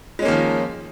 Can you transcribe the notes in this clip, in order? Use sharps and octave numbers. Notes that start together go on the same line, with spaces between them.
D#3 F3 G#3 A#3 C#4